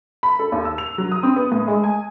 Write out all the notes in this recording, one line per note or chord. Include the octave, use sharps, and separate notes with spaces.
B5
A4
D#2
E6
F7
F#3
D#6
C4
B3
A2
G#3
G#5